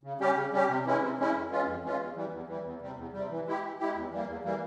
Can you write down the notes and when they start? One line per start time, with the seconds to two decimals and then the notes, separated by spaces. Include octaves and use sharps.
0.03 C#3
0.19 G3 C#4 G4
0.36 C#3
0.52 G3 C#4 G4
0.69 C3
0.85 E3 G#3 C#4 E4
1.01 C3
1.18 E3 G#3 C#4 E4
1.34 F2
1.50 E3 G#3 C#4 F4
1.66 F2
1.83 E3 G#3 C#4 F4
2.00 E2
2.15 E3 G3
2.32 E2
2.47 E3 G3
2.64 E2
2.81 C3 G3
2.97 E2
3.13 C3 G3
3.30 E3
3.46 G#3 E4 G4
3.63 E3
3.79 G#3 E4 G4
3.95 E2
4.11 E3 G3 A#3
4.27 E2
4.44 E3 G3 A#3